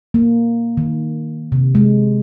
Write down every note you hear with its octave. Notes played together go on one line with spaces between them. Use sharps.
A#3
D#3
C3
G#3